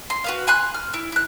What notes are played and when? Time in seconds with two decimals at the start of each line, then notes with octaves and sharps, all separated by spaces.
0.10 C6
0.24 F#4 B4 F5
0.47 G#5 B5 C6 F#6
0.74 F6
0.94 E4
1.12 E4 F#6